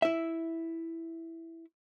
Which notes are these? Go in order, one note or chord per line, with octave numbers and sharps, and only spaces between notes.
E4 E5